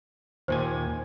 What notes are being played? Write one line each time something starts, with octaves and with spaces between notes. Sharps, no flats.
D#2 A#2 C5 G#5